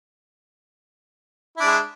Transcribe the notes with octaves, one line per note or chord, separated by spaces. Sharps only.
G#3 D4 E4